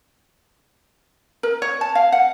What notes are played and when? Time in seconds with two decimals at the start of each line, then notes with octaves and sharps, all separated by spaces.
1.43 A#4
1.62 C#5
1.81 A5
1.95 F5
2.12 F#5